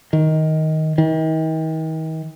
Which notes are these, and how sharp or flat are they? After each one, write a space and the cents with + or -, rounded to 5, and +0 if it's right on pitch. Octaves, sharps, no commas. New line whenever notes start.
D#3 +10
D#3 +40